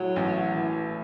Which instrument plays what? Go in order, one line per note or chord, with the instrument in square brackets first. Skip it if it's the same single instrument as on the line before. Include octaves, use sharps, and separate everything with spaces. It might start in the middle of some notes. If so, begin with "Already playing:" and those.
Already playing: [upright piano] A2 A3 [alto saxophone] F#3
[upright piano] A1
E3